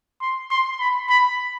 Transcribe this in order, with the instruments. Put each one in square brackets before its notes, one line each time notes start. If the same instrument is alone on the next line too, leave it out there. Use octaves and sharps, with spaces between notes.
[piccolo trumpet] C6
C6
B5
B5